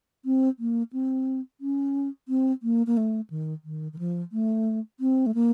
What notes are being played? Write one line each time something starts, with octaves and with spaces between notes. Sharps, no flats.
C4
A#3
C4
C#4
C4
A#3
A#3
A3
D#3
D#3
D#3
F3
A3
C4
A3
A#3